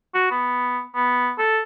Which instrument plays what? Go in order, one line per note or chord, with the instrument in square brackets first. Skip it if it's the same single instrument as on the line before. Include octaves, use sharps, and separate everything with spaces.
[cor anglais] F#4
B3
B3
A4